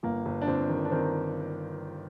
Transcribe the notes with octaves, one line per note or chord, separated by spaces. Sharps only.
G1 A#3
G1
D4
G1 C4
D#3
D4
D#3 C4